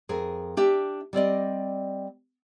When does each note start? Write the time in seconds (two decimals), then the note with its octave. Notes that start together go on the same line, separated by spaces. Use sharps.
0.09 F2 G#4 A#4
0.57 D4 G4 E5
1.13 G3 C4 D5 D#5